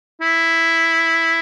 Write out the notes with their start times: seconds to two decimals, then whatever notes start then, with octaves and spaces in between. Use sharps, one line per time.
0.21 E4